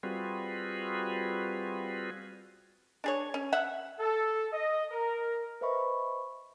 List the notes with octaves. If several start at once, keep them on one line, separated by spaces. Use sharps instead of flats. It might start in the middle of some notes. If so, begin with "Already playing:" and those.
G3 C4 F4 F#4 G#4 B4
D4 G#4 C#5
C#4
E5 F#5
A4
D#5
A#4
B4 C5 D#5 E5 B5 C#6